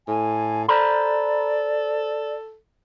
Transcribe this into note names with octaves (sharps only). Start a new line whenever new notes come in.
A2 G#5
A4 C5 D5 A#5 B5